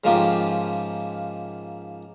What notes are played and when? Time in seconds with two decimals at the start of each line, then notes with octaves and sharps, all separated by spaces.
0.04 G#2 C#3 F3 A#3 F4 G4